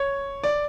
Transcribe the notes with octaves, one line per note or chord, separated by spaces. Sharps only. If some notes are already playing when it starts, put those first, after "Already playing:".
Already playing: C#5
D5